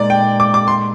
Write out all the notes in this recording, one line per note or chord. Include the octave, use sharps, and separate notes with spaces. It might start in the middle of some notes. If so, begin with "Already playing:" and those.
Already playing: A#2 G#3 D#4 A#4 D5
G5
D6
D6
C6